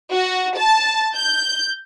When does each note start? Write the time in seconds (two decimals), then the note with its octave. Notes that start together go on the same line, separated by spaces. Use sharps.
0.11 F#4
0.57 A5
1.15 G6